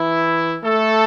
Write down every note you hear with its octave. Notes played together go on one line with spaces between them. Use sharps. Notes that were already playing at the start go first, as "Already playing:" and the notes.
Already playing: E3 E4
A3 A4